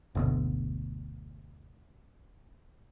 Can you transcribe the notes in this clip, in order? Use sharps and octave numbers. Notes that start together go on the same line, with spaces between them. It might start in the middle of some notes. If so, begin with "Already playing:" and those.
F#1 D2 B2